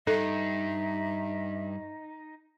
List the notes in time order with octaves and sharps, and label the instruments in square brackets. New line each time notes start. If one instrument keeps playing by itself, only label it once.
[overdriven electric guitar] G2 [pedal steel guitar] D#4 [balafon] A4 [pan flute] E5